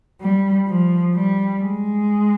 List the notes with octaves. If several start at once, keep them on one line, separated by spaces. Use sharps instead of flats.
G3
F3
G3
G#3